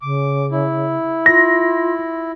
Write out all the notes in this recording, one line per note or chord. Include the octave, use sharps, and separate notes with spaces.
C#3 D6
E4
F4 A#6